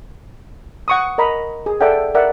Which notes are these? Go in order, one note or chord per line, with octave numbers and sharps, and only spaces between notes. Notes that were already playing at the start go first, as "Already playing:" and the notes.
F#5 C#6 D#6
A#4 D#5 A#5 B5
G#4
A4 D5 E5 F#5 G5
A#4 D5 E5 F#5